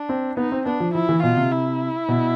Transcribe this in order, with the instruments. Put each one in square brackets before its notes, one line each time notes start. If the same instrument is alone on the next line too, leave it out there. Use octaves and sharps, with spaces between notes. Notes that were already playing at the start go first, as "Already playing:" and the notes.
Already playing: [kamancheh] D4
[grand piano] C4
[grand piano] B3 [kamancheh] D#4
[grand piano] C4
[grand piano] B3 [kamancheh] D4
[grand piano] F3
[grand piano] F3 [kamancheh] E4
[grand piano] E3
[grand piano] B2 [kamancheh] F4
[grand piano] C3
[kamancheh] E4
[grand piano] B2